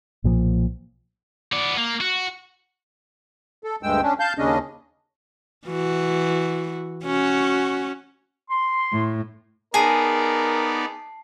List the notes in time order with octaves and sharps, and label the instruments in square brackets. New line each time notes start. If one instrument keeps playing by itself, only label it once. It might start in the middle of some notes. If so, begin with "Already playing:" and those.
[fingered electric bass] B1 A#2 F3
[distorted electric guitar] B3 D5
A#3
F#4
[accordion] A4
D2 G2 G#3 G5 E6
C#4 D4
F5 A5 G6
D#2 C#3 C#4 D4 D#5
[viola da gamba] E3 F#4
C#4 F#4
[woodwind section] C6
[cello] A2
[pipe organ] B3 D#4 D5 [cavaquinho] G#4 [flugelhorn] A#4 [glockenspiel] A5 C7